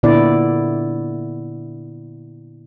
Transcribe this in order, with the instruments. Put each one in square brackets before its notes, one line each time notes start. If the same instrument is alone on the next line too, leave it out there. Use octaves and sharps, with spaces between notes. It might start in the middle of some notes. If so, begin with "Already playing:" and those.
[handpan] A#2 D3 B3 E4 D5